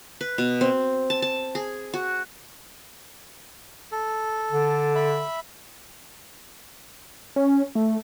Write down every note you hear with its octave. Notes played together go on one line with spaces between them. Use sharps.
B4
B2
C4
A5
A5
G#4
F#4
A4
D3
E5 B5
C#4
A3